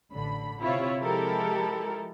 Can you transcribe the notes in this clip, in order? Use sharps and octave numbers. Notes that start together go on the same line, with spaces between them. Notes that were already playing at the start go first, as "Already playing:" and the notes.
A1 D3 B5
C3 E4 F4 C#5
F3 G#3 E4 G4 A4 A#4